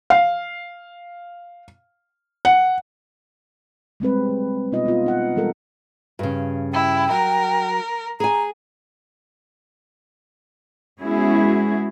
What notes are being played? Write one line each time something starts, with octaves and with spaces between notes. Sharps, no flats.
F5
F#5
G3 G#3 C4 B4
F#3
B2 B3 D#4 F4 D#5
B3 F4
D#4 F#5
E3 G3 G#3 A4 A#4
G2 C#3
E4 G5
F#3 A#4
G#4 G#5 A#5
G#3 B3 C#4 E4 F#4 G#4